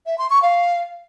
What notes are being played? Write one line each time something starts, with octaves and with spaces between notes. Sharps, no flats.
E5
C6
C#6
F5